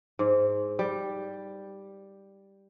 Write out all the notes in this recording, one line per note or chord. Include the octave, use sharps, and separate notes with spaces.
G#2
G3